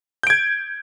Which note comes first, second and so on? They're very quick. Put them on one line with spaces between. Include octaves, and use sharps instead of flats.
G6 D7 G#6